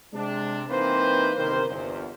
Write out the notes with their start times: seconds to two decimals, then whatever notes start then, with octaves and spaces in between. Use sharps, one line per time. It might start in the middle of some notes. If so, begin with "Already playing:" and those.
0.13 C3 G#3 C4 D4
0.69 E3 A#3 C4 D#4 B4 C5
1.37 G1 C3 D#3 A#4 C5
1.69 G1 E2